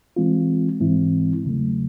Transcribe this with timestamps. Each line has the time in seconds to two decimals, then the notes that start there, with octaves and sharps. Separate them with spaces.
0.16 E3 G#3 C4 F4
0.80 G#2 E3 G#3 C4 E4
1.44 E2 C#3 F#3 A3